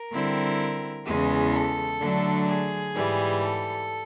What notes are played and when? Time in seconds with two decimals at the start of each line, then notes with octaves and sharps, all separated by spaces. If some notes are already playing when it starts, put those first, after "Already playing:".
Already playing: A#4
0.11 D3 G3 C4 E4
1.06 E2 C#3 E3 G#3
1.54 A4
2.01 D3 F#3 A3 D4
2.48 G#4
2.96 G#2 E3 G3
3.43 A4